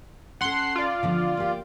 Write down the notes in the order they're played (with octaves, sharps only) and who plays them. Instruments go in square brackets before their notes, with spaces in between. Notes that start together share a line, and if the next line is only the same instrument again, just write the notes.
[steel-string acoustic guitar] C#4 A4 [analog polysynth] F#5 C6
[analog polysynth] F4 D5
[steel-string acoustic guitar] D3 F3 B3
A#3 G4